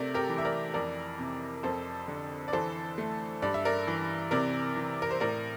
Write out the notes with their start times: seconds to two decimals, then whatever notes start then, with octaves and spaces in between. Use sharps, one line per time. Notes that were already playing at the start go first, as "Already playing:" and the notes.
Already playing: C3 A3 A#4 D5
0.14 G4 A#4
0.29 E3
0.38 E5
0.45 A#4 D5
0.74 F2 A#4 D5
1.19 C3
1.63 F2 A4 C5
2.08 D3
2.48 D5
2.53 E3 A4 C5
2.98 A3
3.42 G2 D5
3.54 E5
3.65 A#4 D5
3.87 E3
4.31 C3 A#4 D5
4.76 E3
5.02 A#4
5.11 C5
5.20 A2 A#4 D5